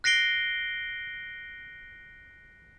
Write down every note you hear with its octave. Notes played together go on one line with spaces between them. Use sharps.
F#6 A#6 C7 D7 G7